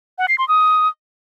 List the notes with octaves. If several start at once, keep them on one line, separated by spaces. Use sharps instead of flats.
F#5
C7
C6
D#6